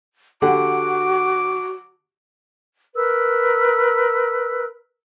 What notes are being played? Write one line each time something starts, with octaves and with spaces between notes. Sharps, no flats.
D3 F#4 G4 F#5 D6
A#4 B4 E6